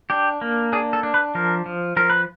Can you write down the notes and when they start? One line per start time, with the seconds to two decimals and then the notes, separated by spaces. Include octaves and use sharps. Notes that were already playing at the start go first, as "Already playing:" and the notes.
0.10 D4 G4
0.41 A#3
0.73 D4 G#4
0.93 A4
1.03 D4
1.14 B4
1.35 F3 A#4
1.66 F3
1.97 F3 A#4
2.10 B4